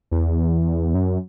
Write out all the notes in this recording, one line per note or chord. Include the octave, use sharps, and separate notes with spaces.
E2
F#2